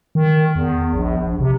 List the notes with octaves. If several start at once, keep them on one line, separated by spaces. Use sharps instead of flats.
D#3
E2
A#1
A#1
C3